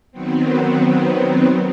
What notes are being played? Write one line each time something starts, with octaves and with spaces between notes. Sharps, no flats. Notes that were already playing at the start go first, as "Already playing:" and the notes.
D#3 F#3 B3 C4